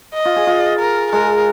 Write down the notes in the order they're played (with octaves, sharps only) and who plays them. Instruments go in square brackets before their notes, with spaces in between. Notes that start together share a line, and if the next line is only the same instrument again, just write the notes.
[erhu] D#5
[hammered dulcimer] F4
G#4
F4
[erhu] A#4
[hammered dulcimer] G#3 [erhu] A#4